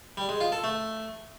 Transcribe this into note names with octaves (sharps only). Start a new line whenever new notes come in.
G3
G#3
F4
A4
A3